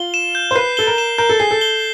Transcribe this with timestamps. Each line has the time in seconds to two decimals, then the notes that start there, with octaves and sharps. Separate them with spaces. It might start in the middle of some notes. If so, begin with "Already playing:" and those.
Already playing: F4 G7
0.14 E7
0.35 G6
0.51 C5
0.55 B4 C7
0.77 A4 G7
0.87 A#4
0.98 E7
1.18 A#4 G6
1.30 A4
1.39 G#4 C7
1.51 A4
1.61 G7